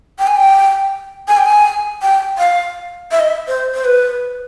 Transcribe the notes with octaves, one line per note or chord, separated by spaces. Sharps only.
G5
G#5
G5
G#5
G5
G#5
G5
F5
E5
D#5
E5
C5
C5
B4